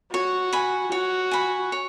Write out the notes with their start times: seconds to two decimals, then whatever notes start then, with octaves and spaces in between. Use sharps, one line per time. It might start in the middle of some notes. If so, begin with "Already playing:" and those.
0.13 F#4 C#5
0.53 G#5 B5
0.92 F#4 C#5
1.31 G#5 B5
1.72 C#5